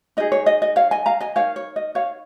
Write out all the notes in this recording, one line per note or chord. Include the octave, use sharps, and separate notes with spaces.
D#4 G#4 D#5
C#5
D#5
D#5
C#5 F5
D#5 G#5
F5 A#5
D#5 G#5
D#4 A#4 C#5 F5
C#5
D#5
C#5 F5